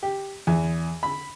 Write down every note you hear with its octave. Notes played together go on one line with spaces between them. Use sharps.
G4
E2
B5